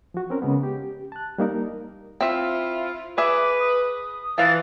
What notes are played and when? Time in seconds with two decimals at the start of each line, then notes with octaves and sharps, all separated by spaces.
0.14 F3 F#4
0.30 C4 C#4 A#4
0.42 C#3 G#3 B3
0.63 G4
1.12 A5 F#6
1.38 G3 A#3 D#4 A#4
2.21 C4 E4 F4 E5
3.18 G#4 B4 E5 D6
3.60 D#6
4.38 E3 F3 F5 A6